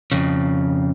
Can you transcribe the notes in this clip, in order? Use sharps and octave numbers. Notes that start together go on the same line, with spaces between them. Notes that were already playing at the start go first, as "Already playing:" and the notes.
F2 C#3